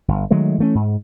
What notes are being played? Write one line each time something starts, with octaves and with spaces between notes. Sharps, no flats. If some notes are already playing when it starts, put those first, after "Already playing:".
G1
D#3 F#3 G#3 A3
E3 A3 C#4
G#2